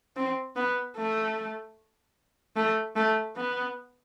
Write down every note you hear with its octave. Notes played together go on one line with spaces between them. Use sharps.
C4
B3
A3
A3
A3
B3